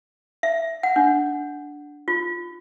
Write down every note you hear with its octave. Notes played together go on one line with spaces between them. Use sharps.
E5
F#5
D4
F4